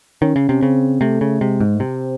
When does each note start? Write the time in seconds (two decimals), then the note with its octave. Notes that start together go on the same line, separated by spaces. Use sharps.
0.22 D#3 C#4
0.36 C#3
0.49 C3
0.62 C#3 C4
1.01 C3 A3
1.21 C#3
1.41 C3 G#3
1.60 G#2
1.74 A3
1.80 C3 C4